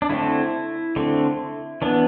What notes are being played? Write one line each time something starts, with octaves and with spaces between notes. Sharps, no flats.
D4
D3 A3 C4 E4
D3 A3 C4
E3 B3 D4